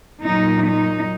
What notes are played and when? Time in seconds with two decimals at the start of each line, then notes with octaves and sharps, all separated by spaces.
0.23 A#2 F#3 D#4
0.66 D#4